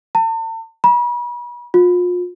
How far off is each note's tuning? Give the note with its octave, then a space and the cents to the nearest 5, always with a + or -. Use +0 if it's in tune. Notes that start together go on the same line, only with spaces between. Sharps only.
A5 +40
B5 -40
F4 +35